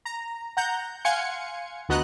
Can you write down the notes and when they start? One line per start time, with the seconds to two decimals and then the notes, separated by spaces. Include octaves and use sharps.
0.05 A#5
0.57 F#5 A#5 G6
1.05 F5 F#5 G#5 C6 G#6 C#7
1.89 D2 B3 F#4 D#5 A#5 F#6